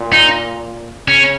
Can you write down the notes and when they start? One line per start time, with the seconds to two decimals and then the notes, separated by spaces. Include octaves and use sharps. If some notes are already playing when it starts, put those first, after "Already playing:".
Already playing: A#2
0.13 D#4
1.07 C#3 C#4